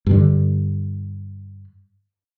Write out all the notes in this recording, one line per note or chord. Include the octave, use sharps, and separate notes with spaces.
G2 D3